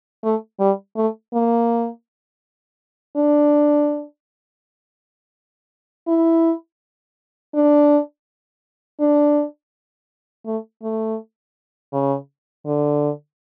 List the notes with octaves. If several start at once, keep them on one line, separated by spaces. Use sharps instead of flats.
A3
G3
A3
A#3
D4
E4
D4
D4
A3
A3
C#3
D3